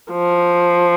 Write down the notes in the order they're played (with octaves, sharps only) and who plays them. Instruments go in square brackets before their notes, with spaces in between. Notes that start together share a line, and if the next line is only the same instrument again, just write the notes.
[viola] F3